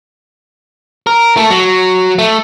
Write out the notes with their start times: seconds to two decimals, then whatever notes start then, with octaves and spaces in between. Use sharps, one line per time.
1.07 A#4
1.37 A3 A4
1.50 F#3
2.19 A3